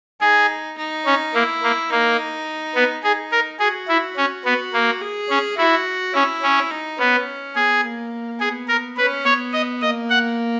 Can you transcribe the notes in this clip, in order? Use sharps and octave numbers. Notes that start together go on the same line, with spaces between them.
D#4 G#4
D#4
C#4
A#3 E4
A#3
A#3 D#4
B3
D#4 G#4
A#4
F#4 G#4
E4
C#4
B3 F#4
A#3
G#4
C#4
E4 F#4
C#4 E4
C#4
D#4
B3 C#4
B3 G#4
A#3
B3 G#4
A#4
C#4 B4
B3 C#5
D#5
A#3 D#5
F#5